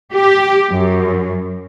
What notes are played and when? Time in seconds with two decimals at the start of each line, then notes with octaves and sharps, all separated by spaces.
0.13 G4
0.71 F#2